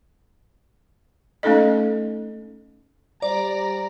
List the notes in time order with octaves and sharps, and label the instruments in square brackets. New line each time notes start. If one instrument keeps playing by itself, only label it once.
[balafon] A3 C#4 D#4 A4 D#5
[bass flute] G3 [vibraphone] C5 [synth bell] D5 [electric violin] A#5